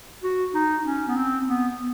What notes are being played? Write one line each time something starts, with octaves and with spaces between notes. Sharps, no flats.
F#4
D#4
C#4
B3
C4
B3
B3